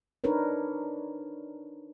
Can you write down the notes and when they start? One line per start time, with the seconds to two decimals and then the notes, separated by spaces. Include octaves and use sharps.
0.24 D4 D#4 A#4 B4 C#5